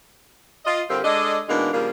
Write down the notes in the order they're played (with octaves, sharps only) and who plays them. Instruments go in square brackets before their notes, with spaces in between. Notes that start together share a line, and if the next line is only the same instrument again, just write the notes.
[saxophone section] F4 D#5
D3 G3 C4 F4 G4 A#4
G#3 D4 A4 D5 D#5
B2 E3 G#3 A#3 D4 D#4
C#3 F3 G3 A#3